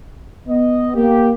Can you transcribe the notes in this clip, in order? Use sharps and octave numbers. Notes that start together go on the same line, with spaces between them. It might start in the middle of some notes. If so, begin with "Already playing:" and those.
B3 D#5
A#3 G4